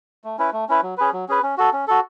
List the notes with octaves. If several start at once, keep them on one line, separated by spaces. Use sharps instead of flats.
A3
C#4 E4 B4
A3
C#4 E4 B4
F#3
C#4 G#4 B4
F#3
C#4 G#4 B4
C#4
F#4 A4
C#4
F#4 A4